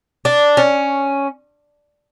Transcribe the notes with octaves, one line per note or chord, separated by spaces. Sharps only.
D4
C#4